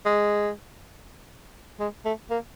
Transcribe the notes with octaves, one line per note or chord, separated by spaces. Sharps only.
G#3
G#3
A3
A#3